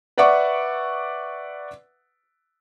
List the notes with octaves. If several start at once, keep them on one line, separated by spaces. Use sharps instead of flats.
B4 D5 E5 F#5 C#6 D6